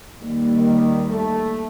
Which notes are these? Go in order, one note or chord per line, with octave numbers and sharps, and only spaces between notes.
D#2 G3
D#3
A3